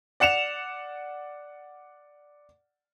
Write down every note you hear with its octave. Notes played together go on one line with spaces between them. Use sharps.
D5 F#5 C#7 E7 F7